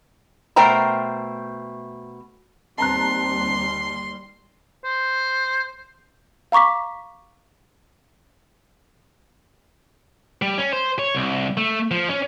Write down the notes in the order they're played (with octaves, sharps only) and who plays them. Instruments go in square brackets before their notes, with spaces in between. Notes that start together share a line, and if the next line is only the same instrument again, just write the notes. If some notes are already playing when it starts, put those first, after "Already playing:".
[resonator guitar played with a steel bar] B2 A3 A#4 C5 G5 A#5
[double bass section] D#2 G3 [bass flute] C4 [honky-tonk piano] A5 A#5 F#6 [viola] C6
[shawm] C5
[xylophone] F5 A#5 C#6 D6 B6
[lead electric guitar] G3
C#4
C5
C#5
C2
A3
F3
C#4